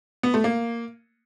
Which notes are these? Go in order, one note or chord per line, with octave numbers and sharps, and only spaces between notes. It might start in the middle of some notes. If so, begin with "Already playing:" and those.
B3
A3
A#3